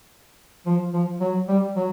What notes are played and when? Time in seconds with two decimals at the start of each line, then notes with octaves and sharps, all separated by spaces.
0.66 F3
0.93 F3
1.20 F#3
1.48 G3
1.76 F#3